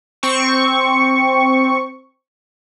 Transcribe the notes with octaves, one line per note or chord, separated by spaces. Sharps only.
C4 C#6